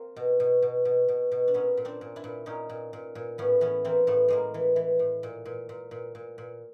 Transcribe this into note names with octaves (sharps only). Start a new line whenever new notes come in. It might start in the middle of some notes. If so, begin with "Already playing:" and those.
Already playing: A#3 C4
B2
B2
B2
B2
B2
B2
D4
A#2 B3 C#4
A#2
C4 D4
A#2
D4 E4
A#2
A#2 C#4 D#4
A#2
A#2
A#2
A2 B3 C#4
E3 B3 C#4
E3 A#3 C4
A2 A3 B3
A2 G#3 A#3
E3
E3
A2
A#2
A#2
A#2
A#2
A#2
A#2